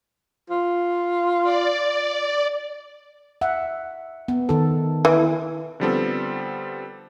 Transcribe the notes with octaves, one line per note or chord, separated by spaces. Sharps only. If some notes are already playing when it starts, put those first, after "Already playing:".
F4
D5
E5 F#5
B3
D#3 A4
E3 E4
D3 F3 G3 B3 C4 A4